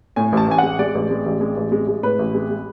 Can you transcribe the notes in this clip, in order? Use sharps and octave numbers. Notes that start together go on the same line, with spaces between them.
A2 G#5
A1 A5
A1 G#5
G#3 F#5
G#3 D5
A1
G#3
A1
G#3
A1
G#3
G#3
A2 B4
A1
G#3
G#3